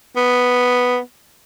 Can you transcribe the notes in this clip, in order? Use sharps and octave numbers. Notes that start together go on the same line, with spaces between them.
B3